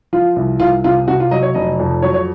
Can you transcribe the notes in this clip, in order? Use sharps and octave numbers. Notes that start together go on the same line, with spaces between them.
F3 F4
C2
C2 F4
C3 F4
C3 F#4
F4
F#3 D#5
C#5
F1 D#5
F2
F#3 C#5
C#5